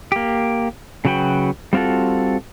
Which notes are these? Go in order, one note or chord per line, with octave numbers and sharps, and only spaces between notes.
A#3 G4
C#3 F#3 F#4 B4 G5
G3 C4 F4 F#4 A4